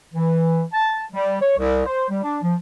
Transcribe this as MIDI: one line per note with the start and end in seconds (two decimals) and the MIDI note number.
0.14 0.63 52
0.73 1.01 81
1.13 1.41 55
1.42 1.54 73
1.58 1.83 36
1.87 2.06 72
2.10 2.20 55
2.23 2.37 62
2.43 2.55 53